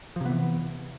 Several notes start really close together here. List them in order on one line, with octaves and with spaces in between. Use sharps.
F3 C3 B3 E3